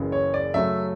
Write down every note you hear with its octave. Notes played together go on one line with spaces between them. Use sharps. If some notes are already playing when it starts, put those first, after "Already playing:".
Already playing: F#1 F#2 C#3 E3
C#5
D5
F#2 C#3 F#3 A3 E5